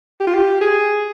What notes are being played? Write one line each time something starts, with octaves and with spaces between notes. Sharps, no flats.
G4
F4
G4
G#4